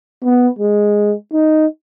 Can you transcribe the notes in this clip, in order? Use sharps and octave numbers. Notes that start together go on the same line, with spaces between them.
B3
G#3
D#4